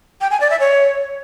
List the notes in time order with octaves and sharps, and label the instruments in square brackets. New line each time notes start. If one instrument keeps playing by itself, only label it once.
[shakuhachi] G5
G#5
D5
E5
C#5